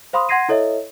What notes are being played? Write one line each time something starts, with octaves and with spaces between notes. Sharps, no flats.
C5 F5 B5 C6 D#6
F#5 C6 G#6 A#6 C7 D#7
E4 A4 C#5 D#5 E5